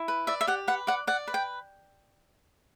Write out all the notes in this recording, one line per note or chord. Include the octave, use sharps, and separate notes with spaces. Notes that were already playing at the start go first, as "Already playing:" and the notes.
Already playing: E4
B4
D5 E5
E5
G4 F#5
B4 F#5
D5 F#5
D5 F#5
B4
G5